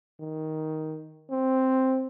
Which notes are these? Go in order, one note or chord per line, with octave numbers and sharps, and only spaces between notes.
D#3
C4